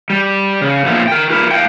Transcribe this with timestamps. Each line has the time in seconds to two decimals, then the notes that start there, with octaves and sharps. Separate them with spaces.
0.10 G3
0.61 C#3
0.86 A#2 F3 A3 B3 F4
1.08 A#4 G5
1.30 F4 A#4 B4
1.51 A2 F5 G5